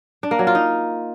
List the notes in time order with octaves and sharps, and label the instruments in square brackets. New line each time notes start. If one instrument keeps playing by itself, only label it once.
[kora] D4
A#3
F#3
F4
D#4